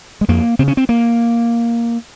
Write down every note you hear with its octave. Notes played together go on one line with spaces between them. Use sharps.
G#3
F2 A#3
C#3 C4
C#4
C4
A#3